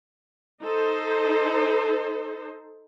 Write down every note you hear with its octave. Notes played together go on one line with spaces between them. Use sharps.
D#4 A4 C5